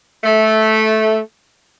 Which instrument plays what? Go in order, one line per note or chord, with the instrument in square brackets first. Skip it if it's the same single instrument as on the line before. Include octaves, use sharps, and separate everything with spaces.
[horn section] A3